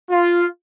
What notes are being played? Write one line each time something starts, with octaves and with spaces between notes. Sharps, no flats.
F4